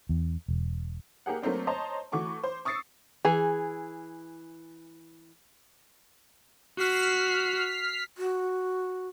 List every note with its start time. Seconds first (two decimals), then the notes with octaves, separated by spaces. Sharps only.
0.09 E2
0.48 E1
1.26 A#3 G4 G#4 F#5
1.42 F#3 A3 A#3 C4 D4
1.67 C5 C#5 D#5 A5 A#5 C6
2.12 E3 A3 F#4 C#6 D6
2.43 C5
2.65 C#6 D#6 E6 A6 C7 C#7
3.25 E3 G#4
6.78 F#4 F6 B6 C7
8.17 F#4